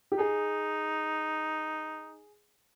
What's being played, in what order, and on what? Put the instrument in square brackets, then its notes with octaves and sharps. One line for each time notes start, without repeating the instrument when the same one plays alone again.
[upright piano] G4
[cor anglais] D#4 [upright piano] G#4